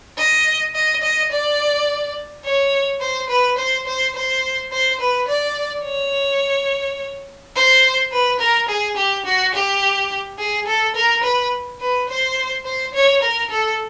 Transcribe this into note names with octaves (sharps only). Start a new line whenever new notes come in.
D#5
D#5
D#5
D5
C#5
C5
B4
C5
C5
C5
C5
B4
D5
C#5
C5
B4
A#4
G#4
G4
F#4
G4
G#4
A4
A#4
B4
B4
C5
C5
C#5
A#4
A4